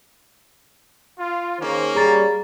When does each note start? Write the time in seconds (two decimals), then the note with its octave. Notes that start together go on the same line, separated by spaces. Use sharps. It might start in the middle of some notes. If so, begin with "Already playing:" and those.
1.18 F4
1.59 D#3 A#3 C#4 G#4 C5
1.95 G3 G#4 A#5 A6